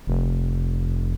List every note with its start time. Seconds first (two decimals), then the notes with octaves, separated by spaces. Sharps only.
0.07 F1